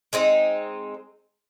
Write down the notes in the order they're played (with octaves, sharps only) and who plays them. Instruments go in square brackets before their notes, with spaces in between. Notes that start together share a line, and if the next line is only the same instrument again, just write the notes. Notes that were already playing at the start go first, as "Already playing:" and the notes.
[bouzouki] G#3 C4 D#4